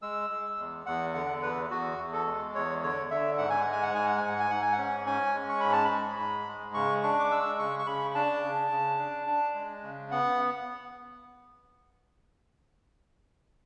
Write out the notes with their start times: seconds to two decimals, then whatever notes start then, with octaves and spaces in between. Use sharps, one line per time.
0.02 G#3 E6
0.30 G#3
0.59 E2
0.86 E2 F#5
1.14 D3 F#5
1.43 E2 B4
1.70 E2 F#4
1.98 E2
2.13 A4
2.27 G#3
2.55 E2 C#5
2.83 D3 C#5
3.11 D3 E5
3.38 G#2 F#5
3.50 G#5
3.61 F#5
3.66 G#3
3.73 G#5
3.83 F#5
3.94 G#2 G#5
4.06 F#5
4.18 G#5
4.23 G#2
4.29 F#5
4.40 G#5
4.51 G#2 F#5
4.62 G#5
4.73 F#5
4.78 C#4
5.07 C#4 G#5
5.34 G#3
5.49 C#6
5.60 G#2 B5
5.73 A5
5.85 B5
5.91 G#3
6.19 G#2
6.47 G#3
6.74 C#3 C#6
7.03 D4 C#6
7.20 D6
7.31 G#3 E6
7.59 C#3 C#6
7.79 C#6
7.87 C#3 B5
8.15 D4 A5
8.43 C#3
8.71 C#3
8.99 D4
9.27 D4
9.55 G#3
9.83 C#3
10.11 B3 F#5